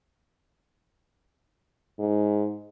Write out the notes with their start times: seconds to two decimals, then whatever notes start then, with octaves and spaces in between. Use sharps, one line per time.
1.99 G#2